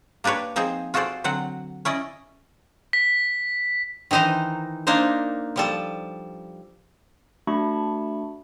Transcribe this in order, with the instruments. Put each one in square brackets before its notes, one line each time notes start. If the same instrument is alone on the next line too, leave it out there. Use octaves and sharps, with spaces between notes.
[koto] A#3 D4 G4 B4 C#5
F3 C4 D#4 G#4 C5
F4 F#4 G#4 A4 C5 D5
D3 F#3 C4 F#4 F#5
C#4 E4 D5 D#5
[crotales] B6
[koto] D#3 E3 D#4 C5 A#5
A#3 D4 D#4 A#4 C5
F3 G3 A4
[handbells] A3 D4 F#4 A5 B5 C#6